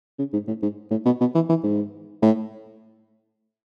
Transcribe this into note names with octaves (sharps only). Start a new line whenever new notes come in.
C#3
G#2
A2
G#2
A2
B2
B2
E3
E3
G#2
A2